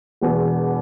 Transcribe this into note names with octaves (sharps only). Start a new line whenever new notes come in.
E1 E2 B2 B3